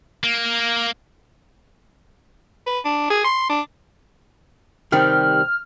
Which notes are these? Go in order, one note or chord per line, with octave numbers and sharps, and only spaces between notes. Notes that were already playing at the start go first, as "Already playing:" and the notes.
A#3
B4
D4
G#4
C6
D4
C3 D#3 G3 F6